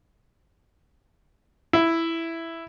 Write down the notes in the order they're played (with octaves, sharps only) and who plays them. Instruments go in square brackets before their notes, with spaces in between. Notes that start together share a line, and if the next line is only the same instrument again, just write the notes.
[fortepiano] E4